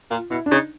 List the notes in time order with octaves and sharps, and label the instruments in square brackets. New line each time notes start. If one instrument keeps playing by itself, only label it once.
[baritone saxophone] A#2 [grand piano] F4
[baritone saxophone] B2 [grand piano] E4
[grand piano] D4
[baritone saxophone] C#3 [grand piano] D#4